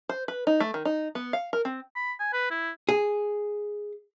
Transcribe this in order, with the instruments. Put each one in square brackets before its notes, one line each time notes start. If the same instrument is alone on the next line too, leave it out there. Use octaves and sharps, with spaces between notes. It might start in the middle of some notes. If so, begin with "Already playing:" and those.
[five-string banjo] C5
B4
D#4
A3
D#3
D#4
B3
F5
A#4
C4
[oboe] B5
G#5
B4
E4
[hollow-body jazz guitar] G#4